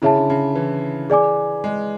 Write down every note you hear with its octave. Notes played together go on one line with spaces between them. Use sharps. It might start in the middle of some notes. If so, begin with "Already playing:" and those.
C#3 E4 G#4 C#5 E5 A5
D3
C#3
E3
G#4 D5 G#5 D6
G#3